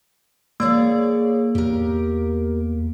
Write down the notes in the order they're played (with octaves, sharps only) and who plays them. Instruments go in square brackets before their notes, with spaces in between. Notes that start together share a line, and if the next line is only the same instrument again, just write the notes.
[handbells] A#3 [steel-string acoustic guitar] G#4 C#5 D5
[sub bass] E2 [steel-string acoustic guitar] G4 A#4